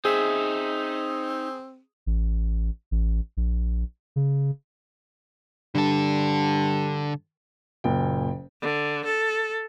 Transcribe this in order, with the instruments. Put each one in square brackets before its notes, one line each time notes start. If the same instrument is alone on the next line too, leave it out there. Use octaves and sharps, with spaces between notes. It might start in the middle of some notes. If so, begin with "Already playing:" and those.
[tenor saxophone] C4 [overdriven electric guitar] D#4 E5 [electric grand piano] G#4
[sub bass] A1
A1
A#1
C#3
[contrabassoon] G2 [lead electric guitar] D3 A4
[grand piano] F#1 A#2 G5
[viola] D3
A4